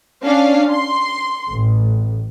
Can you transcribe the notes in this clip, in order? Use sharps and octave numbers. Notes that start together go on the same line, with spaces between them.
C#4 D4 F5
C6
A1